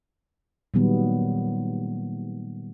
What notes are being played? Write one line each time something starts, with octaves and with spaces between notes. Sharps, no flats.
A#2 D#3 F#3 G3 B3